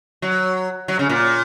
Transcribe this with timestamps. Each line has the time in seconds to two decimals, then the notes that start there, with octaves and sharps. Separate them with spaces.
0.22 F#3
0.88 F#3
0.99 C#3
1.09 A#2